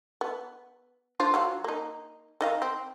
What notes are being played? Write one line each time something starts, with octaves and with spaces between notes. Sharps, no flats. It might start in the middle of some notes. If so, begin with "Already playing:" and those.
B3
D4 F4 C5
F#3 F4 F#4
A#3 D#4
D#3 D#5 F5
C4